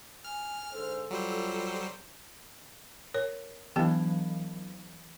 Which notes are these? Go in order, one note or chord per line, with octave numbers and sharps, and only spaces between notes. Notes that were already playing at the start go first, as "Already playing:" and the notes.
G#5 F6
G#2 D3 A4 C5
F#3 G3 F4 C5
A#4 C#5
E3 F#3 B3 G4 G5